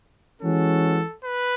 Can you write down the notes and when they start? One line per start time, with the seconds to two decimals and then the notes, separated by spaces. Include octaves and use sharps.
0.41 E3 G#3 C#4 F#4 A4
1.24 B4